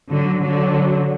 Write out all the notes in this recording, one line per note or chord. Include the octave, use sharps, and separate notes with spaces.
D3 F#3
D3 F#3